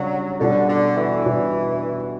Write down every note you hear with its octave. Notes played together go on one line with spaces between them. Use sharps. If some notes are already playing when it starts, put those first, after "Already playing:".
Already playing: C#3 F#3 G3 D4 F#4
B2 D3 G3 D4
D3
E3
B2 G3 D4